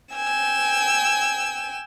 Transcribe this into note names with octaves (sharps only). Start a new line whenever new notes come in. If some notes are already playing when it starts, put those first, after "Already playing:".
G5 G#5 E6